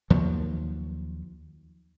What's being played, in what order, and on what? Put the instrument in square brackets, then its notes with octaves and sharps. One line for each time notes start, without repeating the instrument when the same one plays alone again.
[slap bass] D#2 F3 F#3